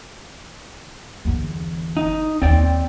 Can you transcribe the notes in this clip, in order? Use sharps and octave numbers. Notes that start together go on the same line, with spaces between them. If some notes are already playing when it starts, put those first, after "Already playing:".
G1 E2
D#4
D#2 C4 D5 G5